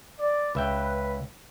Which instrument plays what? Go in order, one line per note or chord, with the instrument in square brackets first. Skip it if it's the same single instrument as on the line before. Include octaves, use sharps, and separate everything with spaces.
[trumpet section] D5
[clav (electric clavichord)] C#2 E5 G5 [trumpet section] B4